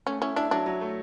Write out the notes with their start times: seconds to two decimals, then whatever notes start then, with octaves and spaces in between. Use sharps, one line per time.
0.07 A3 C#4
0.21 C#4 E4
0.36 D4 E4
0.51 F#3 D4
0.66 F#3
0.81 A3